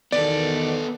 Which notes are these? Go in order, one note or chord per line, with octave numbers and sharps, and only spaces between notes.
E2 B2 D#3 B3 A4 D5